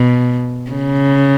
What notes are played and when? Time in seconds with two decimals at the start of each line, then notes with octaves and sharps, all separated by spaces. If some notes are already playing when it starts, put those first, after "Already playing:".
Already playing: B2
0.71 C#3